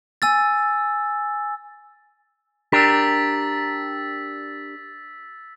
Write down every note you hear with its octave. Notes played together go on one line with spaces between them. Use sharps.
G#5 E6 A6
D4 G4 A#4 E6 A6 B6